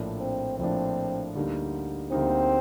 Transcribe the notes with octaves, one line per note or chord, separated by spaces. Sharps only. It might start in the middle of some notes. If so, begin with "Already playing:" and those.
Already playing: A#1 A2 F3 A#3 D4
C4
A#1 A2 F3 A#3 C4 D4
D2 D3 G3 A#3 D#4
D2 D3 G3 A#3 C4 D#4